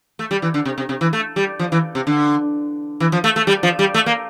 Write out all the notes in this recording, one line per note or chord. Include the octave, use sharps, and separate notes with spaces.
A3
G3
E3
D3
C3
C3
C3
E3
A3
G3
F3
E3
C3
D3
E3
F3
A3
A3
G3
F3
G3
A3
A#3